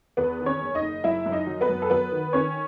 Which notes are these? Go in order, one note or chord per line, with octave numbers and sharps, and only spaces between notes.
E2 B3 B4
D#3
C#4 C#5
F#1
D#4 D#5
F#1
F#2 E4 E5
F#2
D#4 D#5
F#3
B3 B4
F#2
A4
F#3 B3 B4
D#3
D#3 C#4 C#5